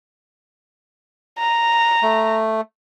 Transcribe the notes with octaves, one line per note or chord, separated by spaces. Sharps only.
A#5
A3